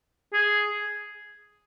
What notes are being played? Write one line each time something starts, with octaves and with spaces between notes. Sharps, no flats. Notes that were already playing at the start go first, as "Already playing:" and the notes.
G#4